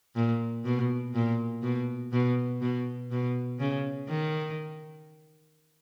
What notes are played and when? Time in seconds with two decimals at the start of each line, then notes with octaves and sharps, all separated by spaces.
0.16 A#2
0.65 B2
1.15 A#2
1.63 B2
2.12 B2
2.61 B2
3.11 B2
3.59 C#3
4.08 D#3